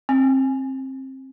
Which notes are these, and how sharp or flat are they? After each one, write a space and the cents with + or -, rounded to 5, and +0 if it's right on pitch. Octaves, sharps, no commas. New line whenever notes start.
C4 +25